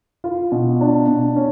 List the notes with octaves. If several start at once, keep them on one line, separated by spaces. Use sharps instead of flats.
F4
B2
D4
B2
C#4